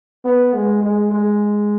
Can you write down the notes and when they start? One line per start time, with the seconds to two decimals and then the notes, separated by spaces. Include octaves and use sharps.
0.25 B3
0.54 G#3
0.82 G#3
1.12 G#3